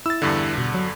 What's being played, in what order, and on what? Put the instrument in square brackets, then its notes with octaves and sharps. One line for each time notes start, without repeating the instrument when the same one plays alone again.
[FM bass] E4 [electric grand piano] E6 A6
[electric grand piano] E2 G2 D3
[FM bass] B2
F#3